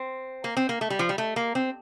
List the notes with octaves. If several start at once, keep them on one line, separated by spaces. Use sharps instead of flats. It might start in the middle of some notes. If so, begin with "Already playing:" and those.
Already playing: C4
A#3
C4
A#3
A3
G3
F3
G3
A3
A#3
C4